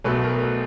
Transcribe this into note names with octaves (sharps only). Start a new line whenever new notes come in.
B1 B2 F#3 A3 B4
A#4
B4